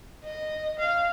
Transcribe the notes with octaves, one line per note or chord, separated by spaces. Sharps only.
D#5
F5